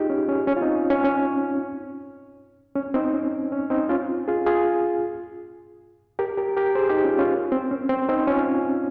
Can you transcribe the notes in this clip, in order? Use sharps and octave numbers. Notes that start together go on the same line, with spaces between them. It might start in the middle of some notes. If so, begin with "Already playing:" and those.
Already playing: D#4 F4 G4 G#4
C#4
C#4
C#4
F4
C4 D#4
C#4
C#4
C#4
C#4
C4 D#4
C#4
C#4
C4 D#4
C#4 F4
F4 G#4
F4 G#4
G4 A#4
G4 A#4
G4 A#4
G#4 C5
D#4 G4
C#4 F4
C#4 F4
C4
C#4
C4
C4 D#4
C#4 F4